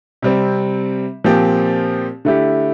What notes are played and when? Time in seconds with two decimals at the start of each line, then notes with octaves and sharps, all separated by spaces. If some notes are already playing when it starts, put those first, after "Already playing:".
0.22 C3 G3 C4
1.24 A#2 F3 C4 G4
2.25 D3 A3 E4 G4